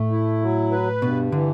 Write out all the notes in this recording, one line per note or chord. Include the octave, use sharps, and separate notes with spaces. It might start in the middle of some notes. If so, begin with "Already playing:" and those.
Already playing: A2 A3
E4
F#3
B4
G2 B2
D3 E3